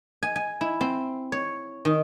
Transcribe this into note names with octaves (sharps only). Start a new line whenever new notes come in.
G#5
G#5
E4
C4
C#5
D#3